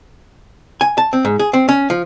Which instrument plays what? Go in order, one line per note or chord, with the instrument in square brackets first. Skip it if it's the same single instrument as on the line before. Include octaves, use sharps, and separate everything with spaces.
[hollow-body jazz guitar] G#5
A5
C4
G#2
G#4
C4
C#4
F3